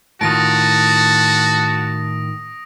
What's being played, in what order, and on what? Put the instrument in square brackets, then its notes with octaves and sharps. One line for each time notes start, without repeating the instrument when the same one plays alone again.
[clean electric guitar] A2 D#3 F4 [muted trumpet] F#4 [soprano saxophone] A5 [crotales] D#6 A#6 D7